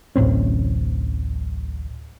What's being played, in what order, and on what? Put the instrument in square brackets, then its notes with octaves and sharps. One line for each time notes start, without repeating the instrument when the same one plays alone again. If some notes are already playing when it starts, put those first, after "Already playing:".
[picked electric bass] D1 A1 C4 C#4